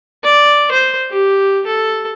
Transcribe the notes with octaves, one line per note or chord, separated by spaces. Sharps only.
D5
C5
G4
A4